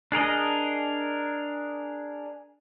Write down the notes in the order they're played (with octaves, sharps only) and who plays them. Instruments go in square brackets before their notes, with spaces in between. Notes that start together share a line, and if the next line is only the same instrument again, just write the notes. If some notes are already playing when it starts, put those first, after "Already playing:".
[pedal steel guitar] D4 G#4 A#4 D#5